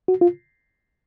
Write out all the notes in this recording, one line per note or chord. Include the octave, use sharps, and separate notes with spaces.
F#4
F4